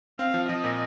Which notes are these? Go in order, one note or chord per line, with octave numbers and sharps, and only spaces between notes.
C4 F5
F3
F3 D#5
A#2